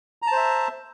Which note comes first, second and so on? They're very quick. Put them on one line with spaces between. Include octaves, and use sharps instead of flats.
A#5 A5 C5 E5